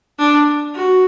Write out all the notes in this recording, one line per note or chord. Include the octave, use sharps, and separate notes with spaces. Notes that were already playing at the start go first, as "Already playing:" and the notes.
D4
F#4